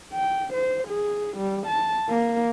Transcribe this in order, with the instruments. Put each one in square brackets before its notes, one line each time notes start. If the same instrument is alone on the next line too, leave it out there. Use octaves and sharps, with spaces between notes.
[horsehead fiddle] G5
C5
G#4
G3
A5
A#3